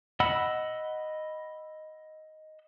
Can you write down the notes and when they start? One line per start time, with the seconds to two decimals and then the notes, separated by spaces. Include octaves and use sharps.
0.20 D#5 F#5 B5 E6